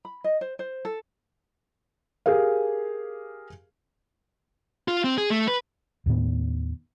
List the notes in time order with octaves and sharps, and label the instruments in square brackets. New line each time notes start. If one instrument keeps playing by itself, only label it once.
[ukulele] B5
D#5
C5
C5
A4
[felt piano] G4 G#4 A#4 F5
[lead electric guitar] F4
C4
G#4
A3
B4
[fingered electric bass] D#2 A2 D#3 B3